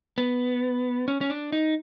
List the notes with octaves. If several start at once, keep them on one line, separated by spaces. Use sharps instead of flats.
B3
C#4
C#4
D4
D#4